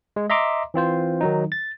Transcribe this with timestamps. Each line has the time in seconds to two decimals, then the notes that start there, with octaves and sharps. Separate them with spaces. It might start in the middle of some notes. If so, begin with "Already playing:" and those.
0.16 G#3
0.30 D#5 E5 A#5 C6 D6
0.74 E3 C4 F4 C5
1.21 D#3 F#3 D#4
1.52 A6